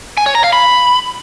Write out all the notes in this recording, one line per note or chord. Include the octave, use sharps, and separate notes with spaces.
G#5
C#5
A#5
F5
B5